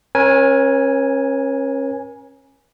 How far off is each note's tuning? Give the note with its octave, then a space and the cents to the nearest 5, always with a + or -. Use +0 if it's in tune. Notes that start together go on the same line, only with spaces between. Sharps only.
C#4 -30 A#4 +40 G#5 +0